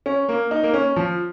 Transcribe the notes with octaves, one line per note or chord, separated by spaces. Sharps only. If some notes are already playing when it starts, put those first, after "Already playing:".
C#4
A#3
D#4
A#3
C#4
F3